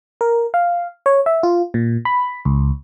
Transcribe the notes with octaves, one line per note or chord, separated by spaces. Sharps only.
A#4
F5
C#5
E5
F4
A#2
B5
C#2